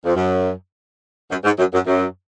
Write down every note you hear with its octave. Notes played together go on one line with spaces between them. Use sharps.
F2
F#2
F#2
G#2
F#2
F#2
F#2